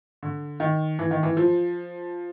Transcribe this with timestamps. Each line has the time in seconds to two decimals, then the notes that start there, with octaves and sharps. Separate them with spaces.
0.23 D3
0.60 D#3
0.99 E3
1.11 D#3
1.23 E3
1.37 F3